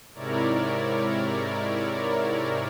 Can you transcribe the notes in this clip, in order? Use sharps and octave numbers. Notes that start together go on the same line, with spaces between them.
G#2 C3 E4 A#4 C#5 D5